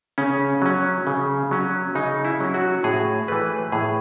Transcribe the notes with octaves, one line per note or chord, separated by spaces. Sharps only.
C#3 C#4
F#3 C#4
C#3
F#3 C#4
C#3 D#4
E4
F#3 C#4
F#4
A2 G#4
E3 A3 B4
A2 G#4